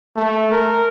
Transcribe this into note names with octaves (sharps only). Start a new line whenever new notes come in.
A3
A#4